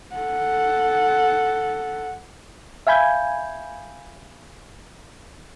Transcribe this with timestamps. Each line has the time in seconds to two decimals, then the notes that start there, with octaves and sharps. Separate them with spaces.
0.16 A4 F#5
2.87 E5 F5 G#5 B5 G6 G#6